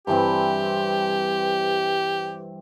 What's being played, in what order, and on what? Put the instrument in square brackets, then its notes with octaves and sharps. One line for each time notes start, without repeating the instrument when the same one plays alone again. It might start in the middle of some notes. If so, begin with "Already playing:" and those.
[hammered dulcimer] G2 E3 C4 [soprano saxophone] G4